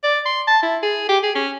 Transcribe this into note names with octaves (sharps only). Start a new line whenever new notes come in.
D5
C6
A5
E4
G#4
G4
G#4
C#4